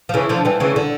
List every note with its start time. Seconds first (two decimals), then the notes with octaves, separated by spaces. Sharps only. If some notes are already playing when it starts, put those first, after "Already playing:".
0.09 F3
0.14 C#3 E3
0.29 D3 F3
0.45 E3 G3
0.60 C#3 E3
0.76 D3